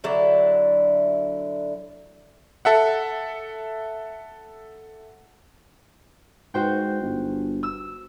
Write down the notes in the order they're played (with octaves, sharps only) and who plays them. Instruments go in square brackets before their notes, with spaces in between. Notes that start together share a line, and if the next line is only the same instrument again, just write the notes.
[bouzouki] D3 F#3 E4 D5
[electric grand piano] A4 E5 F#5
[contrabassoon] G#2 [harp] F#4 C5 G5
[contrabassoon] G1
[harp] E6